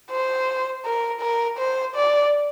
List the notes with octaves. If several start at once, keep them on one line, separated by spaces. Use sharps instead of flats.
C5
A#4
A#4
C5
D5